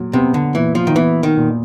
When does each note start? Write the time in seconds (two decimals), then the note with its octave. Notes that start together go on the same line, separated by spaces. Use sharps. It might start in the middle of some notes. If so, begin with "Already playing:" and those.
Already playing: A#2 F#3
0.13 C3 B3
0.34 D3
0.55 A#2 E3
0.75 F3
0.87 D#3
0.95 E3 B3
1.23 D#3
1.37 A#2